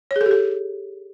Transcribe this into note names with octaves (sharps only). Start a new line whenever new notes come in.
C#5
G#4
A4
G4
A4